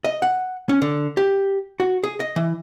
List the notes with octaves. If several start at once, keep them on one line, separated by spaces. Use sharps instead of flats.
D#5
F#5
C#4
D3
G4
F#4
G#4
D#5
E3